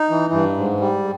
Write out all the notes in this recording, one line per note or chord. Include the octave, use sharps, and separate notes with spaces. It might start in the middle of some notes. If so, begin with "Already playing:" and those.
Already playing: D#4
E3
G2
G#2
G3